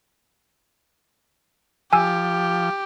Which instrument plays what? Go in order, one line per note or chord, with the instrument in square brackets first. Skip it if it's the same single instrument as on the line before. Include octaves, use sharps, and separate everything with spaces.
[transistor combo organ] F3 [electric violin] G4 [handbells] G#5 E6